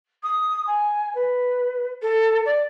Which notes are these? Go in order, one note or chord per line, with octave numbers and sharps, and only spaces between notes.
D#6
G#5
B4
A4
D5